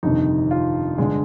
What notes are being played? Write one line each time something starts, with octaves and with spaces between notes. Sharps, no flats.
G1 F2 C3 D#3 D#4
F4
G1 D3 G#3